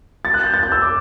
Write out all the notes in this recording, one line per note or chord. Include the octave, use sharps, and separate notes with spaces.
A6
F#6
G6
A6
G6
E6
D6